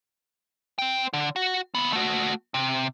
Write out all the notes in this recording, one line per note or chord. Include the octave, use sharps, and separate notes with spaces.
C5 G5
D3
F#4
D#2 B3
A3 F#4
C3